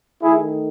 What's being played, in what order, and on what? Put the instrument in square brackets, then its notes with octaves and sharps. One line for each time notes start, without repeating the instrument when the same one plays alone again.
[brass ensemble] D#3 A3 E4 G#4